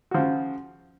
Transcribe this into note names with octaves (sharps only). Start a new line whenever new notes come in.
C#3 F3 F#4